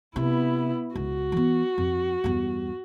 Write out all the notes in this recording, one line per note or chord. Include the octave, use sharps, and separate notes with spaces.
C3 B3 E4
C#2 F#4
E3 B3
F2
E2 G2